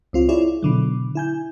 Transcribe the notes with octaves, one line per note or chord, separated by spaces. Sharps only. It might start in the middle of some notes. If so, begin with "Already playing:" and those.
C#2 C4 F4
E4 F4 G#4 C#5 D5
B2 D3 F#3
E4 G#5 G6